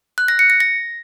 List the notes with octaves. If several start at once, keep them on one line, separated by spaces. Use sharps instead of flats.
F#6
A#6
C#7
A#6
A#6